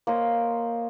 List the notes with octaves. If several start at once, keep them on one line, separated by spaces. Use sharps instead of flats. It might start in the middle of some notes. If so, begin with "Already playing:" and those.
A#3 C5 C#5 D#5